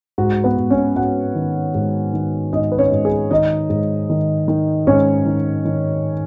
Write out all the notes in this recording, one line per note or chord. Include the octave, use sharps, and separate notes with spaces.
G#2 F#4
B3 B4
G#2
C#4 C#5
G#2 F#4 F#5
D#3
G#2
D#3
G#2 D#4 D#5
B4
C#4 C#5
G#2
G#4
D#3 D#4 D#5
G#2
D#3
D#3
G#2 C#4 C#5
D#3
D#3